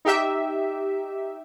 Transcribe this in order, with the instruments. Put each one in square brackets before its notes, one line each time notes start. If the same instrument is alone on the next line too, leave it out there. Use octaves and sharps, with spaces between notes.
[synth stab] D#4 G4 E5